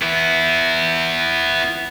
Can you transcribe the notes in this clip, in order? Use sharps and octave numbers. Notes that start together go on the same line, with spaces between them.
B3 E4